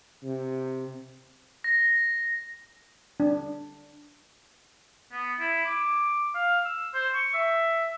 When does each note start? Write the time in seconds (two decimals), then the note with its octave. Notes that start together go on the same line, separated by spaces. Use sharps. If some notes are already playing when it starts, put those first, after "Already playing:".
0.24 C3
1.64 A#6
3.20 D4
5.12 B3
5.39 E4
5.65 D6
6.35 F5
6.65 E6
6.94 C5
7.14 C#6
7.34 E5